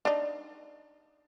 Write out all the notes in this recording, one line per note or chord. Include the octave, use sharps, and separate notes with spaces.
D4 D#4